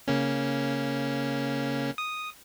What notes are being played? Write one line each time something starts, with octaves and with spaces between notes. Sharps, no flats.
C#3 A#3 C#4
D#6